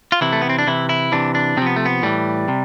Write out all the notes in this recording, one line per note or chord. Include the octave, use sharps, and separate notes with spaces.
F4
C3 E3 E4
A3
B3
C4
D4
C3 E3 E4
E4
C3 E3 D4
D4
C3 F3 B3 C4
A3
B3
A2 E3 G3
C3